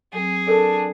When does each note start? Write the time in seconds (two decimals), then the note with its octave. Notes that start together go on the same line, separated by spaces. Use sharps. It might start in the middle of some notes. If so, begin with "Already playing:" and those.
0.13 F#3 C4 G#4
0.47 D4 A4 A#4